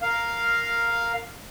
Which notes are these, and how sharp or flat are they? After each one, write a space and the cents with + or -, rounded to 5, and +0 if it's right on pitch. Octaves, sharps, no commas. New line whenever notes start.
A#4 +0 F5 +0